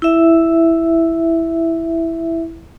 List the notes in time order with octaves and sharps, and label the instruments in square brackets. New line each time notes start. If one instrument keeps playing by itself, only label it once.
[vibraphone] E4 E5